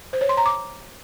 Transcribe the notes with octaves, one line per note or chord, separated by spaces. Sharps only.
C5
C#5
C6
A#5
D6